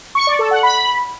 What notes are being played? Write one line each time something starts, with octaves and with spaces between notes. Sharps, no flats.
C#6
D5
A4
F#5
B5